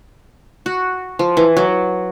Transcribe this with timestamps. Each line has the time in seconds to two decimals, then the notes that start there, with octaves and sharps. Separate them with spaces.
0.66 F#4
1.19 F3
1.37 E3
1.57 F#3